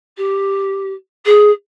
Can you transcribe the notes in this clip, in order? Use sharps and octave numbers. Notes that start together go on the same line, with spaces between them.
G4
G#4